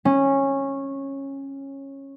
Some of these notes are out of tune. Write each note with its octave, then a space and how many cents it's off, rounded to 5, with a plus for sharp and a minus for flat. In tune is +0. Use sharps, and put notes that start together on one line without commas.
C#4 -15